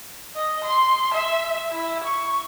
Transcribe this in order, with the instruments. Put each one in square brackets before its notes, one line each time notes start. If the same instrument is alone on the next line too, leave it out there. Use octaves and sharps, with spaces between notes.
[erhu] D#5
C6
E5
E4
C#6